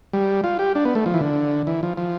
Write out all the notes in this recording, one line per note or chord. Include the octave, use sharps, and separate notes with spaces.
G3
F4
G4
D4
B3
A3
F3
E3
D3
E3
F3
F3